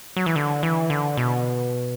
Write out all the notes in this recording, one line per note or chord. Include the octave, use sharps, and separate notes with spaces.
F#3
E3
D3
E3
D3
B2